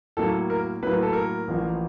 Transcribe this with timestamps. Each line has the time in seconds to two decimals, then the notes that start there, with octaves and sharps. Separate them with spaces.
0.17 A2 F#3 A#3 A4
0.50 A#4
0.83 A2 F#3 A#3 B4
0.92 A#4
1.03 A4
1.13 A#4
1.48 A1 A2 F3 A#3